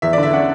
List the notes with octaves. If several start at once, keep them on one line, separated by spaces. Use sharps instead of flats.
E2 E5
D5
D3
E5
C#4 F#5